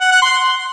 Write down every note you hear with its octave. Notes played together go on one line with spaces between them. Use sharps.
F#5
F#5
C6